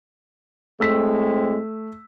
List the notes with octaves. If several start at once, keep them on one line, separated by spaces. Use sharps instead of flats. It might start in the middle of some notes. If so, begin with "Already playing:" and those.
A2 G#3 A3 C4 E6 B6